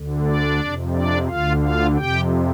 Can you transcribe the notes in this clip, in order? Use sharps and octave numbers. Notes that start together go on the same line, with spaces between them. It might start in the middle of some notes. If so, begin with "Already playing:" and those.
Already playing: D2 D3
D4 D5
F2 C3
D4 D5
D2 D3 F4 F5
F4 F5
F2 C3 G4 G5